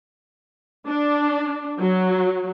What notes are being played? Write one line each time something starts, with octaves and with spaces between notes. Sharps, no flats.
D4
F#3